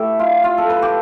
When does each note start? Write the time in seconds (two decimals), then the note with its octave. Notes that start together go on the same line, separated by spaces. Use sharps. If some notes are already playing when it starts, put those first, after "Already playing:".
Already playing: B2 A3 E4 G4
0.19 F4
0.44 F4
0.58 A4
0.70 B4
0.82 G4